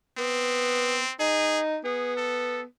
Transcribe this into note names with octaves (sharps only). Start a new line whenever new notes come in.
B3 C4
D#4 G#4
B3 G#4
A4